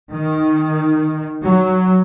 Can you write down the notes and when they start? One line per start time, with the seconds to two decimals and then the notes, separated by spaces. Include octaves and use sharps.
0.13 D#3
1.44 F#3